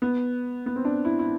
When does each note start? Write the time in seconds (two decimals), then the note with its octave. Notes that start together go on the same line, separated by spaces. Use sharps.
0.02 B3
0.66 B3
0.76 C4
0.85 D4
1.05 E4
1.19 E4